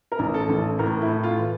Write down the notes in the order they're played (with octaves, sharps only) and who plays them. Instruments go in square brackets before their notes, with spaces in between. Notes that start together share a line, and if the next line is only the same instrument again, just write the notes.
[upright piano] A#4
A1
A4
A1
A4
A2 A#4
E4
A2
F4
E3